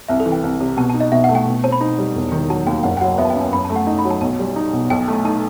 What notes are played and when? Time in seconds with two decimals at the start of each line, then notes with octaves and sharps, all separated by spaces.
0.09 C2 E5
0.20 A4
0.26 E3
0.32 G5
0.43 C2
0.60 C3
0.77 B2 A5
0.90 A5
0.94 D#4
1.01 D#5
1.12 B2 E5
1.24 F#5
1.29 A3
1.35 G5
1.46 B2
1.64 C4 A5
1.72 B5
1.81 D#4
1.98 G3
2.15 E1
2.32 D#3
2.50 F#3 A5
2.67 D#2 G5
2.83 F#1 F#5
2.97 G5
3.01 F#3 F#5
3.18 B3 E5
3.25 A5
3.30 G5
3.36 F#2
3.41 A5
3.53 F#2 B5
3.65 A5
3.70 A3
3.76 F#5
3.87 D#4 D#5
3.99 B5
4.05 F#3
4.11 A5
4.21 B1 A5
4.39 G3
4.56 D#4
4.73 B2
4.90 B1 G5
5.08 A3
5.13 A5
5.24 D#4 A5